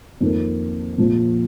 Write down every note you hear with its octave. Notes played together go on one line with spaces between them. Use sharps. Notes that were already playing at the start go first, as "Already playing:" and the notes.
F2 D#3 A#3
A#1 A#2 F3